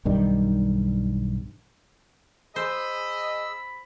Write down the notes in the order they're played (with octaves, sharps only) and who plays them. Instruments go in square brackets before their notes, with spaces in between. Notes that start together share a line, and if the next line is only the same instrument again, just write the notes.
[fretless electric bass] B1 G2 D#3 G3
[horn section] G#4 D#5 [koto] C5 [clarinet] B5 [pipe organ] E6